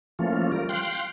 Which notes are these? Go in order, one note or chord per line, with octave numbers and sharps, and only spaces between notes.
E3 F3 A3 A#3 C#4 F4
G3 A#4
F5 G5 C6 F#6